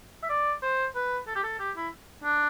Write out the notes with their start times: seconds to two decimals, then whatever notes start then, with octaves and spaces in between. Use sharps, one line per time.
0.23 E5
0.29 D5
0.62 C5
0.95 B4
1.27 A4
1.36 G4
1.44 A4
1.59 G4
1.76 E4
2.24 D4